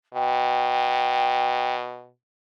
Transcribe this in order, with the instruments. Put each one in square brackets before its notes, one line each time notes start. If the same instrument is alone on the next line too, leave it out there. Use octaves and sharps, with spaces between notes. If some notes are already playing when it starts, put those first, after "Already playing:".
[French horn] B2 [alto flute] G5